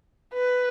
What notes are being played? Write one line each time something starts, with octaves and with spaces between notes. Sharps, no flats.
B4